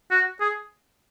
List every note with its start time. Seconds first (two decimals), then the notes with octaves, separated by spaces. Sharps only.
0.11 F#4
0.41 G#4